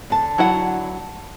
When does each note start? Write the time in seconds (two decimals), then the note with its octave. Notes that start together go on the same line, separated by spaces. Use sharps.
0.10 D3 A5
0.38 F#3 E4 F#5